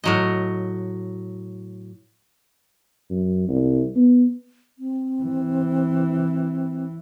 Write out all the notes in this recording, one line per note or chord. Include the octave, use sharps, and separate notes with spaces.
A2 F#3 D#5
F#2
C2
B3
C4
E3